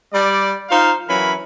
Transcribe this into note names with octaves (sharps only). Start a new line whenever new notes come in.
G3 D5
D#4 F4 C5 F5
E3 F#3 C#4 A#4 B5